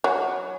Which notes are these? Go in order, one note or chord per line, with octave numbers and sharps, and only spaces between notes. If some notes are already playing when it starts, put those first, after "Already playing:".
F#3